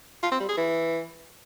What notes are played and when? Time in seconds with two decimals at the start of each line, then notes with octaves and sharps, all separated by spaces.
0.23 F4
0.32 C4
0.40 G3
0.49 G#4
0.57 E3